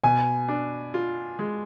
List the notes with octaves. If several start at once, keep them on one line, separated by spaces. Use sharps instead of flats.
B2 G#5
D4
F4
G#3